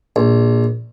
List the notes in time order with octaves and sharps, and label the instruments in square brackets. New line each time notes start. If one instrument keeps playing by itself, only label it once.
[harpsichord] A#1